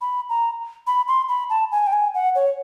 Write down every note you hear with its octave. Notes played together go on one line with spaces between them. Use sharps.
B5
A#5
B5
C6
B5
A5
G#5
G5
G#5
F#5
C#5